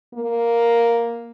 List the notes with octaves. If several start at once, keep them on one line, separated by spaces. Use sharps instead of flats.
A#3